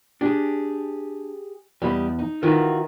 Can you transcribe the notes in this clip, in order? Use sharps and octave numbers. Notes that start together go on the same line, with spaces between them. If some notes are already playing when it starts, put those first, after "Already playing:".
D4 G4 G#4
E2 G3 D#5 B5
D#4
D#3 E3 F4 F#4 A#4 B4